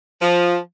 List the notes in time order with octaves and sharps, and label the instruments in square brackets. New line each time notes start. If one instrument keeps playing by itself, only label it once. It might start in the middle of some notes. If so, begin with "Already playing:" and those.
[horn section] F3